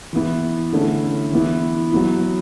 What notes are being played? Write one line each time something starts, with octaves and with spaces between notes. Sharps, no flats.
E3 B3 E4
D3 A3 C#4 E4
E3 B3 E4
F#3 B3 E4